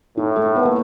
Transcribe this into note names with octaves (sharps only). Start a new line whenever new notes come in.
A2 D#4
A3 A4
B3 B4
A#3 A#4